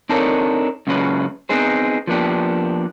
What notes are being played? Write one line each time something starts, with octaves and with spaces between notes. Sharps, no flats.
C4 D4 D#4 A4 A#4 C#5
F#2 C#3 G#3 C#4 B4
B3 C4 D#4 G#4 C5
F3 A#3 B3 D4 G4